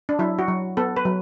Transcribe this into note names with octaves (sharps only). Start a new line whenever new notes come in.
D4
F#3 E4
F#4
F#3
B3 A4
B4
F#3